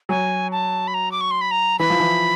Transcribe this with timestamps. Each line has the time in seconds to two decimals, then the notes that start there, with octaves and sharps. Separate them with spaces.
0.09 F#3 G#5
0.52 A5
0.87 B5
0.94 A#5
1.11 D6
1.21 C#6
1.31 C6
1.41 B5
1.51 A#5
1.79 E3 B5
1.90 F3
2.00 E3